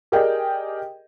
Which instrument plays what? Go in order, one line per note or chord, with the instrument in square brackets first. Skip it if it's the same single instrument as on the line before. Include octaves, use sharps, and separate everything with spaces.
[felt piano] G4 G#4 A#4 D5 D#5 G5